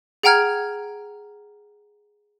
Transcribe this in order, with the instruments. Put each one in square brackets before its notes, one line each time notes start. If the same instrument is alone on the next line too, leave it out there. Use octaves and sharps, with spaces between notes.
[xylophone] G#4 F#5 G5 A#5 F6 G#6